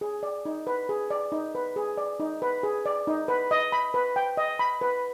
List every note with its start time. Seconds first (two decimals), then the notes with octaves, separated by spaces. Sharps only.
0.01 G#4
0.23 D5
0.45 D#4
0.67 B4
0.89 G#4
1.11 D5
1.32 D#4
1.55 B4
1.76 G#4
1.98 D5
2.20 D#4
2.42 B4
2.63 G#4
2.86 D5
3.07 D#4
3.28 B4
3.51 D#5
3.72 B5
3.94 B4
4.16 G5
4.37 D#5
4.59 B5
4.81 B4